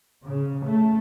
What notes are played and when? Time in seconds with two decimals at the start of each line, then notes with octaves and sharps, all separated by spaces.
0.22 C#3
0.64 A3